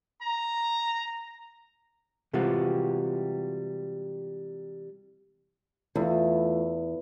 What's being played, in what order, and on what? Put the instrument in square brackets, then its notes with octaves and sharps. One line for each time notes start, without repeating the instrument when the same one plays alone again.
[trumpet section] A#5
[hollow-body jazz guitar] C3 E3 G3 G#3 F4 F#4
[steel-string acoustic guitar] E2 [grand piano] E3 A3 F4